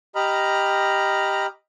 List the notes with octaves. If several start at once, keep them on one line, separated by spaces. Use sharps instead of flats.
G4 D#5 A#5 B5 F6